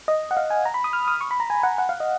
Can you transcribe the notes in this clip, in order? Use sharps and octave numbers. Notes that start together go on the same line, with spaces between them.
D#5
F#5
F5
G#5
A#5
B5
D#6
F6
D#6
C#6
B5
A#5
G#5
F#5
F#5
F5
D#5